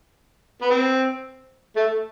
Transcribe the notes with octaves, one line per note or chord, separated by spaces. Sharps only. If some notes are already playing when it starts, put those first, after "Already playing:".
B3
C4
A3